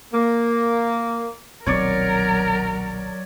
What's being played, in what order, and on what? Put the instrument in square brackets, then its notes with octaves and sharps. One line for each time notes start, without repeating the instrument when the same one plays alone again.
[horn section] A#3
[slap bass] D#1 B1 C4 [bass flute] F#3 [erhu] A#4 [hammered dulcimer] C#5 D5